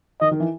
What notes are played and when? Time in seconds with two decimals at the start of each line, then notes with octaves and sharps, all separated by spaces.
0.21 D#3 D#5
0.31 D#3
0.40 E3